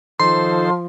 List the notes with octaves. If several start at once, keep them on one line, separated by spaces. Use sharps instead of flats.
D#3 F3 A4 C5 C6